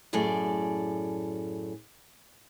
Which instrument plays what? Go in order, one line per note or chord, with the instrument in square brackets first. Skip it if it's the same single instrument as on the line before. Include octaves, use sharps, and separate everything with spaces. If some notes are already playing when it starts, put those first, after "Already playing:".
[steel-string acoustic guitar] F#2 A2 G#4 A4 D5